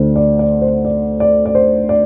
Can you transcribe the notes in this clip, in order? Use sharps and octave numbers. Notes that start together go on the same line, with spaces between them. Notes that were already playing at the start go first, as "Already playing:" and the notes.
Already playing: D2 D3 A3 C5
D5
D5
C5
D5
D5
D5
C5
D5